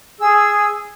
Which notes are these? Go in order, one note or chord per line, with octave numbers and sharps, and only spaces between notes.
G#4 E6